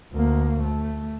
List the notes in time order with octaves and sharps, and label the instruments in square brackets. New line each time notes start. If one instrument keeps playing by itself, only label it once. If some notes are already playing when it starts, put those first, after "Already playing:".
[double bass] D2 A#3
A3